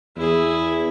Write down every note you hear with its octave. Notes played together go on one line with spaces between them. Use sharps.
E2 E4 G#4